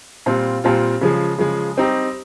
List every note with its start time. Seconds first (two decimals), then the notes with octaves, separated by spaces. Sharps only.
0.26 A#2 G3 C4 F4
0.64 A#2 G3 C4 F4
1.01 C#3 F3 G#3
1.38 C#3 F3 G#3
1.77 G3 C4 D#4 G4